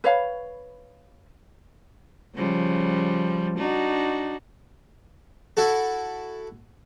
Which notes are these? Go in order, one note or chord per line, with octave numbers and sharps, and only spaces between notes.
B4 C#5 F5 B5
C#3 F3 G3
D4 D#4 F#4
E4 F#4 A4